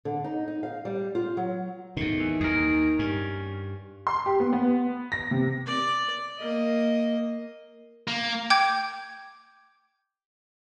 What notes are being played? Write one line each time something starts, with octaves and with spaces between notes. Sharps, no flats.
D3
D#4
D#4
F5
G3
F4
F#3
E2 A2 D#3
E3
D#2 G#4 A#4
G2 C#4
C6
G4
B3
B3
A#6
C3
D5
A#3 D#5
A#3
G5 D6 G6 G#6